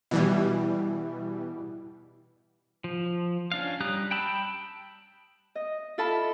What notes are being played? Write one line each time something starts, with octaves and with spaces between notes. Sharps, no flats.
B2 E3 G3 E4
F3
C#4 D4 F5
G3 G4 A#5 D#6 F#6
G5 A5 B5 E6
D#5
E4 F4 A4 A5 B5